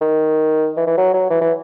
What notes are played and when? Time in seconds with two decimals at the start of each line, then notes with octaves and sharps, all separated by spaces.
0.01 D#3
0.77 E3
0.87 E3
0.98 F#3
1.14 F#3
1.30 E3
1.41 E3